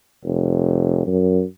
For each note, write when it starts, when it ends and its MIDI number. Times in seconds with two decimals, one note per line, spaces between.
0.23 1.03 29
1.07 1.42 42